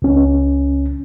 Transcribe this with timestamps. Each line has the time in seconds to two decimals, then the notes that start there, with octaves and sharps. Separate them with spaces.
0.02 C#2 C#4